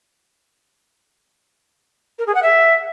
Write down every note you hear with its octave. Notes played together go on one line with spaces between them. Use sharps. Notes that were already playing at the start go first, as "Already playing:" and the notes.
A#4
G#4
F#5
E5